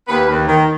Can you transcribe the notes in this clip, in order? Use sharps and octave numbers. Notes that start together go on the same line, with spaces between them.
D#2 B4
D#2
D#3